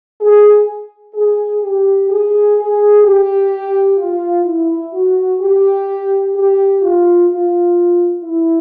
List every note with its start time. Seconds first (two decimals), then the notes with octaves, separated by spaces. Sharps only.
0.21 G#4
1.14 G#4
1.62 G4
2.09 G#4
2.57 G#4
3.04 G4
3.98 F4
4.45 E4
4.93 F#4
5.39 G4
6.34 G4
6.82 F4
7.28 F4
8.23 E4